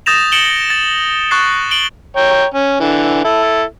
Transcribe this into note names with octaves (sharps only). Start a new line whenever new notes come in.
D#6 G6 A6 A#6 E7 F7
A6 C#7 D7 E7 F#7 G7
A6
C#6 F#6 A6 C7
D7 F#7 G7
C#5 G5 A#5
C#4
D3 E3
E4 A4